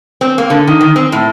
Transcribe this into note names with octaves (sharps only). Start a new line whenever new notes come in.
C4
A#3
D3
D#3
D#3
C4
A2